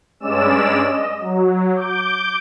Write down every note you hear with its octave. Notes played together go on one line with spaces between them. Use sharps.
G2 G#3 C#4 D5 E6 E7
D#5
F#3
D6 G6